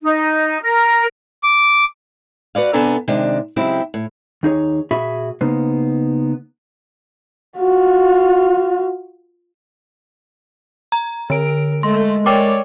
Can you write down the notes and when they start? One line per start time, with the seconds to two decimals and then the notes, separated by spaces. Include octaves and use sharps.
0.03 D#4
0.62 A#4
1.43 D6
2.55 F#4 B4 D5 F5
2.73 C3 B3 D4 A4 G#5 A#5
3.08 C3 D#3 G#3 D4
3.56 C#3 F#3 G#3 C4 E4 G4
3.94 A2
4.43 D#2 D#4 G#4 C#5
4.91 A#2 F#4 G#4 E5 B5
5.41 C#3 A#3 B3 D#4 C5
7.58 F4 F#4
10.92 A#5
11.30 D3 A#4 D7
11.83 G#3 A3 C6
12.26 A#4 C#5 D5 G5 D6